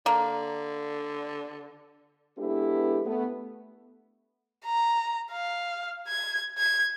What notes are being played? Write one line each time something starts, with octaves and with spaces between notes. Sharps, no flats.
D3 A#3
G#3 B3 D4 E4 G4 A4
A3 B3
A#5
F5
G#6
G#6